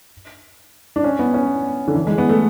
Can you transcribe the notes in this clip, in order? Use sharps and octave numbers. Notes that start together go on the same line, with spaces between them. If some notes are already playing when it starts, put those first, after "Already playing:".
D4
C#4
B3
C#4
D3
E3
G#3
B3
A3